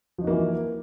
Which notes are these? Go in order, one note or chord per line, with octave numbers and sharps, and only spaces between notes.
E3 F3 A#3 D#4 F#4